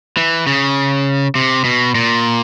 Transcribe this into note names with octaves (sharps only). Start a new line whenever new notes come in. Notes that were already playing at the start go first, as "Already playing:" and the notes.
E3
C#3
C3
B2
A#2